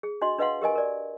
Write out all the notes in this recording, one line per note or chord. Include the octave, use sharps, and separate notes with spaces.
G#4
D4 F#4 D#5 C6
D4 B4 D#5 F5 F#5 C6
G4 A#4 D#5 G#5
A#4 D5